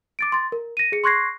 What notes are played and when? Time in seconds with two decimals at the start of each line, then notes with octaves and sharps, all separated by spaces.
0.19 D6 A6 D7
0.32 C6 A6
0.52 A#4
0.77 A#6 D#7
0.92 G#4 C#7
1.04 C6 C#6 F#6 G#6 A#6 C7